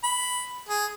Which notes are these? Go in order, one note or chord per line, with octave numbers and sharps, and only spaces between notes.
B5
G#4